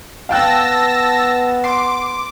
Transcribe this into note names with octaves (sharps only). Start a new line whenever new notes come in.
B3 F5 G5 A5 E6 F#6 A#6
C6 D6